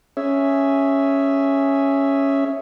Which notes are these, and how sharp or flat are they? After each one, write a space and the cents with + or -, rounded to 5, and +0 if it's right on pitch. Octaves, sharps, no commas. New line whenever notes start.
C#4 +0 G#4 +0 E5 +0